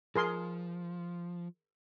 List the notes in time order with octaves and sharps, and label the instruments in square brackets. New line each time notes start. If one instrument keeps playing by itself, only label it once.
[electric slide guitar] F3 [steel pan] G#4 A#4 C6